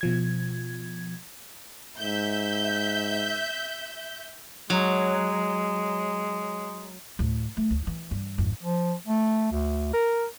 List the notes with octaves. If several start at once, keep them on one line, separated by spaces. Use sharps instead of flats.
B2 F3 G#6
G#2 E5 G6
F#3 G#3
D2 A2
A3
D2
E3
G2
G#1 F2
F3
A3
D2
A#4